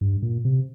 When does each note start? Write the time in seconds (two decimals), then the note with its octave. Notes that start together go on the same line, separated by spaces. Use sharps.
0.01 G2
0.22 A#2
0.45 C3